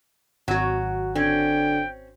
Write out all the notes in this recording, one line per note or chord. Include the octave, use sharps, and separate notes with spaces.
G#1 F#3 F#4
D3 C4 C#4 G5